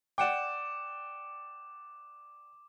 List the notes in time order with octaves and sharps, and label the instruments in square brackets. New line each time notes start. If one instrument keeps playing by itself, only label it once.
[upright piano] D5 F#5 G5 [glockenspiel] D6 E7